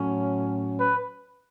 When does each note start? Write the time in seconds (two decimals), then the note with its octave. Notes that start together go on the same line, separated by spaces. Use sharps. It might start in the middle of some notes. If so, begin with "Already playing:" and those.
Already playing: A2 F#3 C#4
0.80 B4